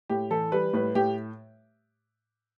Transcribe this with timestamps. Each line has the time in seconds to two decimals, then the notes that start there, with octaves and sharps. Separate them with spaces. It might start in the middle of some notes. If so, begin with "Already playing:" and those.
0.10 A2 G4
0.31 E3 A4
0.52 G3 B4
0.73 A2 B4
0.95 A2 G4